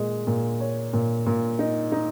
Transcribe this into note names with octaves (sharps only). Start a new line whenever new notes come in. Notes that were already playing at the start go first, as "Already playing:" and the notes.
Already playing: A#2 G#3
A#2
C#5
A#2
A#2
D#4
D#4